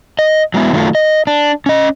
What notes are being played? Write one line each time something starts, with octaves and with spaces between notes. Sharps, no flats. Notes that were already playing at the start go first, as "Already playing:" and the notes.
D#5
F#3 G#3 B3 E4
D#3 F#3 A3 F4
D#5
D4
C#4 D#5